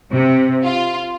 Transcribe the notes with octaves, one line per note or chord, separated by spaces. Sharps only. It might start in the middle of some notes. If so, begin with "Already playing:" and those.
C3
F4